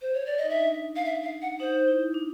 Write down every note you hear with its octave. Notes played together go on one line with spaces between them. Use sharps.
C5
C#5
D5
D#5
D#4
D4 E5
F5
E5
F5
F#5
D#4 C5
E4
D4